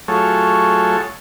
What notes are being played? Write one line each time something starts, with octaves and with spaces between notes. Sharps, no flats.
F#3 A3 F4 G#4 A4 C#5